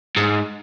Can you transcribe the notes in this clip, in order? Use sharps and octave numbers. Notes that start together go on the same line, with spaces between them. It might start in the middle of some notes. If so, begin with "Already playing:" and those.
G#2